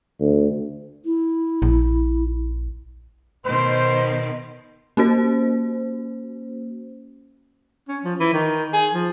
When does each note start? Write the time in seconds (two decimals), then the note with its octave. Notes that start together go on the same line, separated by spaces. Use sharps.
0.20 D2
1.05 E4
1.62 A#1
3.45 B2 D#3 C5
4.97 A#3 C#4 F#4 C5
7.88 C#4
8.05 F3
8.20 E3
8.34 D#3
8.73 G#4
8.94 F3